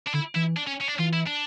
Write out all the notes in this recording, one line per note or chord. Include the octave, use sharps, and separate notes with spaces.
D4
D3 E4
E3 E4
D4
C#4
C#4
D4
E3 F4
E4
D4